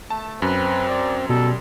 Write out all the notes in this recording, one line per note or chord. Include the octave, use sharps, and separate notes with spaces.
A3 A5
F#2 C4 B4
D5
B2 G3 A4